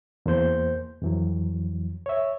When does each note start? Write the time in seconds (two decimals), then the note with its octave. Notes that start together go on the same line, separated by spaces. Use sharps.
0.26 E2 A#3 C5 G6
1.02 F2 E3 F#3
2.06 C#5 E5